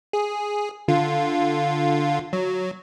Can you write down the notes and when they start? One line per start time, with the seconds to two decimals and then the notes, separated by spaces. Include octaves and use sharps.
0.13 G#4
0.88 D3 F4
2.33 F#3